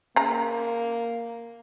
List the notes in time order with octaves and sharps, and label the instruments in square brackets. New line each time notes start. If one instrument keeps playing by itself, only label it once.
[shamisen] C#3 A#5 [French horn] A#3